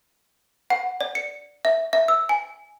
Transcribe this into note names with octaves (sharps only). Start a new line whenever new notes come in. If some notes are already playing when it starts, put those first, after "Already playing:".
F#5
D5
C#7
E5
E5
E6
G#5